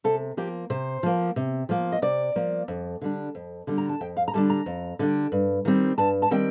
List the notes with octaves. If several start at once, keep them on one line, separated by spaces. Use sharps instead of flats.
C3 A4
F3 A#3 G4
C3 C5
F3 A#3
C3
F3 A#3
D#5
C3 D5
F3 A#3
F2
D3 G3 D4
F2
D3 G3 D4
A#5
A5
F2 G5
F5
A#5
D3 G3 D4 A5
A#5
F2
D3 G3 D4
G2
D#3 G3 C4
G2 A5
A5
D#3 G3 C4 G5